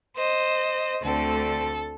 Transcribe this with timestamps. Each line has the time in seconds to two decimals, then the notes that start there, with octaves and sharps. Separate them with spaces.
0.17 C5 D#5
1.02 D2 D3 A3 C4 A4